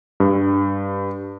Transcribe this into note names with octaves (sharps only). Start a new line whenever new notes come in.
G2